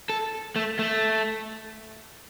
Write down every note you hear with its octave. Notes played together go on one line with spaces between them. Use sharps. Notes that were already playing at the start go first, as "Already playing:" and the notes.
A4
A3
A3